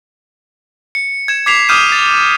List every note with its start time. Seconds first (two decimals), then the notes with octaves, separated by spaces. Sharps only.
0.95 C#7
1.28 G#6 E7
1.46 D6 G#6 B6 C7 E7 F7
1.69 D6 D#6 F6 G6 D#7 E7
1.92 A6